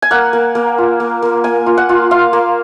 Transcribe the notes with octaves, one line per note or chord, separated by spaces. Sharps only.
G#5
A#3 F#5
A#3
A#3
F4
A#3
A#3
A#3 G#5
F4
F#5
F4
F4 F5
A#3